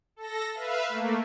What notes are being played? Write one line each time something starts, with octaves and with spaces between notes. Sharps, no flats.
A4 A#6
B4 E5 F5
A3 A#3